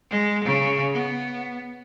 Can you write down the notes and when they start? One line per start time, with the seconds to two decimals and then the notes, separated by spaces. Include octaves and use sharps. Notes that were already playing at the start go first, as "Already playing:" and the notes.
0.10 G#3
0.44 C#3
0.93 B3